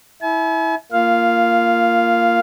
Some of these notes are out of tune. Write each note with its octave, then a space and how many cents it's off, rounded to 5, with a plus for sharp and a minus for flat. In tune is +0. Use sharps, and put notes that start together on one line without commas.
E4 -15 G#5 +45
A#3 -10 F4 -20 F5 +0